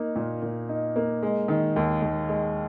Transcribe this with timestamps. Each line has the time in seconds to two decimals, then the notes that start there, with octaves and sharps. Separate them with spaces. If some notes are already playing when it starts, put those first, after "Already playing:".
Already playing: A#3 D#4
0.16 A#2
0.42 A#2
0.69 D#4
0.96 A#3
1.23 G#3
1.48 D#3
1.76 D#2
2.02 D#2
2.29 G#3